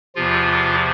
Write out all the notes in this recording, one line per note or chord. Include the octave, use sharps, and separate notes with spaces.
E2 C3 F3 F4